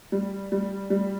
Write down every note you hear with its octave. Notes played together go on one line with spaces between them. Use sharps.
G3
G3
G3